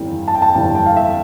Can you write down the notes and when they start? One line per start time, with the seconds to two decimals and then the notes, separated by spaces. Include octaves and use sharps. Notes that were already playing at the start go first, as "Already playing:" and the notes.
Already playing: G1 F2 E3 G3 G5
0.28 A5
0.35 G5
0.42 A5
0.55 G1 F2 E3 G3 G5
0.75 G5
0.86 F5
0.96 E5